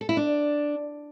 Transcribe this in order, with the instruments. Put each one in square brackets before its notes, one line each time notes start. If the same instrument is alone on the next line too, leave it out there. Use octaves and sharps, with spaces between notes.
[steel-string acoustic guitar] A4
E4
D4